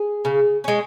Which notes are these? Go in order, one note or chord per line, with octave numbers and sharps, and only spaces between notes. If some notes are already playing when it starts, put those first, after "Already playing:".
Already playing: G#4
C#3
G#3 C#4